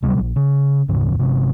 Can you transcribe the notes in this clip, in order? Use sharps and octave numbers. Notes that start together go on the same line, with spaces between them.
D2 C3 F#3 G3
A#1
C#3
F1 D2 G#2 C#3
G1 C3